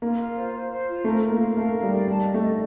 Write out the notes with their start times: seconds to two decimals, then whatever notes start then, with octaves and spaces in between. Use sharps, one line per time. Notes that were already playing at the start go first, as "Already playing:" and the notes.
0.02 A#3 F4
0.19 F4
0.36 C5
0.53 C5
0.71 C5
0.88 F4
1.04 A3 A#4
1.23 A#4
1.30 A#3
1.39 F5
1.56 A3 A#4
1.74 F5
1.82 G3
1.90 D5
2.08 G3 A5
2.24 D#5
2.34 A3
2.42 D#5